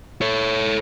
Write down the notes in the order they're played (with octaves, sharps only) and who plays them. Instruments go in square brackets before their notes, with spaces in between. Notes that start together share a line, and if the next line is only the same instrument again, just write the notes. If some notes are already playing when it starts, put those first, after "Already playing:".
[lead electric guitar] A4 C#5